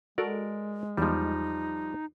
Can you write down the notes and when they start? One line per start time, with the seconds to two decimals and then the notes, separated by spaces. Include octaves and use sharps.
0.18 G#3 F#4 A4 A#4 D5
0.97 E2 F3 G3 D#4